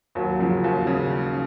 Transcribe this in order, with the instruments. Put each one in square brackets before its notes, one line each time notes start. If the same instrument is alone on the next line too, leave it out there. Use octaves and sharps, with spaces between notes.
[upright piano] D#2 F#3
C#3 F3
D#2
C#3